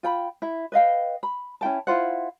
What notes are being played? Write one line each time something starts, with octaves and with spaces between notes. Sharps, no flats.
F4 G5 B5
E4
B4 D#5 F5 G5
B5
C#4 E4 G5 A5
E4 F4 C5 F#5